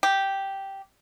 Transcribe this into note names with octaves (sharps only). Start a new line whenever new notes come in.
G4